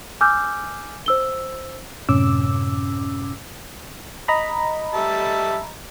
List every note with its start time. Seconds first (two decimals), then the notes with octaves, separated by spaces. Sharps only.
0.21 G#5 D6 E6 F6 G6
1.06 C5 E6 G7
2.09 F#2 A2 C3 C#4 D6 E6
4.28 D#5 A#5 B5
4.94 G3 E5 A5